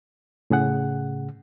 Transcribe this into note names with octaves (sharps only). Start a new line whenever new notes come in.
A2 C#3 G#4 F#5